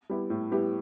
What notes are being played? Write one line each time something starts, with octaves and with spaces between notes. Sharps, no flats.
G3 B3 E4 G4
A2
G3 B3 E4 G4